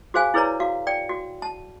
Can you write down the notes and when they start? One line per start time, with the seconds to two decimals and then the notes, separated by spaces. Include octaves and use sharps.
0.14 F#4 G#4 C5 F5 G#5
0.34 E4 G#4 B4 C#5 D5 A#5
0.60 F#4 F5
0.87 D5 G5
1.09 F#4
1.42 A5